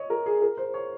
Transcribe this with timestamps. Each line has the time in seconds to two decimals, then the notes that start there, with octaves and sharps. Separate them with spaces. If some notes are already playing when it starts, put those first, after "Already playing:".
Already playing: C#5 D#5
0.10 A#4
0.26 G#4
0.42 A#4
0.57 C5
0.74 C#5